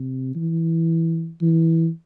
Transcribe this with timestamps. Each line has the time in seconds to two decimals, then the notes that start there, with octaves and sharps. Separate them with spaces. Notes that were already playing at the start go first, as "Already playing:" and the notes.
Already playing: C3
0.35 E3
1.42 E3